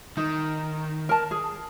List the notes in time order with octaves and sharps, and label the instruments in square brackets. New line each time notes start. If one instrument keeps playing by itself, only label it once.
[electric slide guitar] D#3 [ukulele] D#4
[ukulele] A#4 A5
G#4